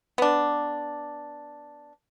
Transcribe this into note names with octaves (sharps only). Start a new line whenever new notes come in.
B3 D4